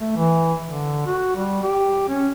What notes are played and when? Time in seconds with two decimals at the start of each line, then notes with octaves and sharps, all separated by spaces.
0.01 A3
0.16 E3
0.65 D3
1.06 F#4
1.36 G3
1.63 G4
2.08 C#4